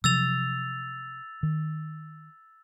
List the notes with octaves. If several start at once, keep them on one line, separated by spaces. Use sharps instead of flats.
C3 F3 F#3 E6 A6 F7
D#3